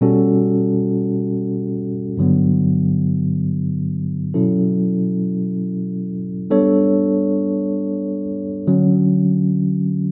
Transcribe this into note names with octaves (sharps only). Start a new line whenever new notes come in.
B2 G3 C#4 F#4 A4
G2 D3 F#3 B3
B2 F#3 C#4 E4 A4
G3 B3 D4 A4 C#5
D3 F#3 C#4